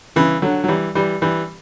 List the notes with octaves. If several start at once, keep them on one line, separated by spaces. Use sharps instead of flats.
C#3 E3
D3 F#3
F#3
E3 G3
E3 G3
E3 G3